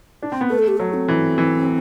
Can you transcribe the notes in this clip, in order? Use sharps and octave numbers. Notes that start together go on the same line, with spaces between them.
D4
C4
B3
A3 B4
A4
G4
F#3 A4
C4
E3
E3